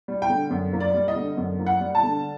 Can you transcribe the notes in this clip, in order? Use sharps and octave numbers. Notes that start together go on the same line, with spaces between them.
G3
G5
D3
F#2
A#3
D5
G3
D#5
D3
F#2
A#3
F#5
G3
A5
D3